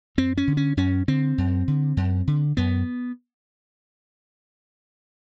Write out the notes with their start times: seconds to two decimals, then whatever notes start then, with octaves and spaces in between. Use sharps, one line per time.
0.17 F#2 C4
0.37 C#4
0.47 D3
0.57 C#4
0.77 F#2 C#4
1.08 D3 C4
1.38 F#2
1.68 D3
1.97 F#2
2.27 D3
2.57 F#2 B3